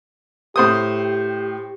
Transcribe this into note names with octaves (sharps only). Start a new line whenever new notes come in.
A2 G4 C5 D#6